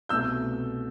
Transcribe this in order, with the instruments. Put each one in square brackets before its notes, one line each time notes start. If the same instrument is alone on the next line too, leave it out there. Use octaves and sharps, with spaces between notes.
[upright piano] C2 B2 A3 E6 G6